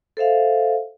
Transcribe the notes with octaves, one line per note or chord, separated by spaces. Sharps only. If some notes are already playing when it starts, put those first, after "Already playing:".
A4 C5 E5 F5